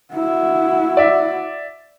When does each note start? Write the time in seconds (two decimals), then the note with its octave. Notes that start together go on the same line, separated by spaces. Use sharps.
0.14 E4 F#4
0.97 D5 E5